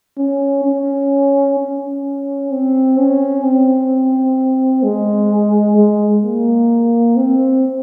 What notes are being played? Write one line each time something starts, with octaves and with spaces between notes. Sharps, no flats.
C#4
C#4
C#4
C4
C#4
C4
G#3
G#3
A#3
C4